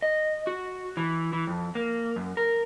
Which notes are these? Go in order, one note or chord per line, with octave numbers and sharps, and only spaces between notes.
D#5
F#4
E3
E3
F2
A#3
F#2
A#4